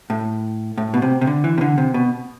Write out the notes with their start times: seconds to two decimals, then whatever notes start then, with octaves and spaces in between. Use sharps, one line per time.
0.10 A2
0.78 A2
0.94 B2
1.02 C3
1.21 C3
1.27 D3
1.44 E3
1.58 C3
1.61 D3
1.78 C3
1.94 B2